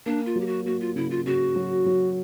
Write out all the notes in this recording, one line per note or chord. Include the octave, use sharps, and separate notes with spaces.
A#3 D4
F4
F#3
G4
F#4
A#3 F#4
F4
C#3 E4
F4
C#3 F#4
F#3
F#3